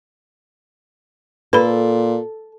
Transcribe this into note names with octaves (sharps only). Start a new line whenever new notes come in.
A#2 A4 B4 B5